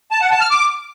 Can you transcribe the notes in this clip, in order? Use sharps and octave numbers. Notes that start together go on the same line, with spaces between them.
A5
F#5
A5
F6
D6